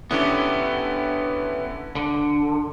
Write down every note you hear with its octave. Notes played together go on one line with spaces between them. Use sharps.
D3 B3 C#4 E4 G4
D3